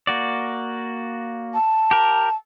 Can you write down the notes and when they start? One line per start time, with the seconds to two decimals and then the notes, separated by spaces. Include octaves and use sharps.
0.07 A#3 F#4 D5
1.53 A5
1.91 G4 A#4